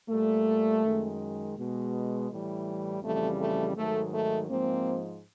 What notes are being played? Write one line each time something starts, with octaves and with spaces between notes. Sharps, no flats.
A#2 G3 A3
F#2 D#3 G#3
B2 G#3
A2 E3 G3
F2 C#3 E3 G3 A3
A3
G#2 D#3 F#3 A3
A3
G#2 F3 G#3 A#3 C4